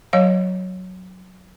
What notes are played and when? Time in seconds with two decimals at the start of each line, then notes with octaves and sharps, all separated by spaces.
0.13 F#3 C#5 F5